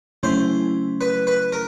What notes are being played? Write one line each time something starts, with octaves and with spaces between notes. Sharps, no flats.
C#3 F#3 A3 C#4 E4 C5
B4
B4
A#4